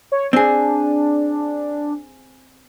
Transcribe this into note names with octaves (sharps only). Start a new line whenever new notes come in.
C#5
C4 D4 G#4